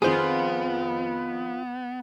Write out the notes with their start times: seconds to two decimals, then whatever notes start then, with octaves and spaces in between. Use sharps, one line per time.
0.02 F2 D#3 B3 F4 G#4 C5